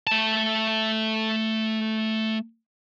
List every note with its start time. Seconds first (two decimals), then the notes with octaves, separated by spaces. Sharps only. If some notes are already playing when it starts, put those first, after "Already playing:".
0.07 A3 A5